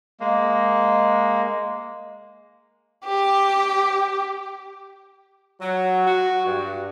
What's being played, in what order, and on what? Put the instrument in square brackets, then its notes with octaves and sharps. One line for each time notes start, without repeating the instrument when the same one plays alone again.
[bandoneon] G#3 A#3
[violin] G4 G5
[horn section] F#3
F#4
G2